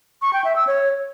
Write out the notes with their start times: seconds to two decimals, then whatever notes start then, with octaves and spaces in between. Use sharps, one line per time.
0.22 C#6
0.33 G5
0.44 E5
0.56 E6
0.67 C#5